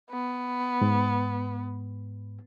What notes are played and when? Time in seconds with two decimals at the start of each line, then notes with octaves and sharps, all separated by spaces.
0.10 B3
0.81 G#2